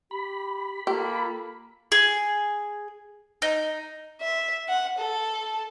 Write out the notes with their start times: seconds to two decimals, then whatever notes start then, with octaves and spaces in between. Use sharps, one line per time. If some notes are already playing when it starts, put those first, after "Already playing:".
0.11 G4 B5
0.87 A#3 F4 G4 A4
1.92 G#4
3.42 D#4
4.21 E5
4.68 F#5
4.99 A4